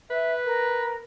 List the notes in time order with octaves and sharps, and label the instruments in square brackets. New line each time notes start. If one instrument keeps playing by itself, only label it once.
[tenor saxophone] B4 [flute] E5
[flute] A#4